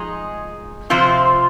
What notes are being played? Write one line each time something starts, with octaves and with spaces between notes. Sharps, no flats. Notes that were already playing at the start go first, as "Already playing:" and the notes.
Already playing: F3 G#3 D#4 G#4
C3 F3 C4 F4 C5